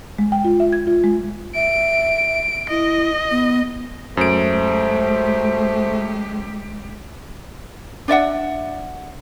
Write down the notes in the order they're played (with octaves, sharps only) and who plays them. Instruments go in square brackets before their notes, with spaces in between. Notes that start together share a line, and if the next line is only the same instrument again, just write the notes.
[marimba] G#3
G5
F4
E5
G#6
F4
G#3
[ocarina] E5 [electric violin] D7
[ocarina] E4 [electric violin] D#5
[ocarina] B3
[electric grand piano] F#2 D7 [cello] G#3 G4 [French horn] A3 [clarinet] C5
[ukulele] D4 D5 E5 F#5